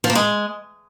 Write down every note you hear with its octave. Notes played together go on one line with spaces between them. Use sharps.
F3
A#3
G#3